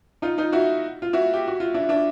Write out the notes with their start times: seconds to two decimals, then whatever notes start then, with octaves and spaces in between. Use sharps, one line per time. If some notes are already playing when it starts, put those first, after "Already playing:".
0.22 D#4 F4
0.38 D#4 F4
0.52 E4 F#4
1.02 F4
1.13 E4 F#4
1.33 G4
1.48 F#4
1.60 F4
1.74 D4 E4
1.89 D4 E4